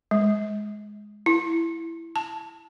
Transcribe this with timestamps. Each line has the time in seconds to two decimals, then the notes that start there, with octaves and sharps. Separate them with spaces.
0.11 G#3
1.26 E4
2.16 A5